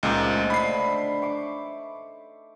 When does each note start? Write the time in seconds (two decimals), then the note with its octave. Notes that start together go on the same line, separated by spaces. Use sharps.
0.03 C#2 A#2 A3 D#4 C5
0.50 D3 B5 C7
1.21 E5 C#6 D6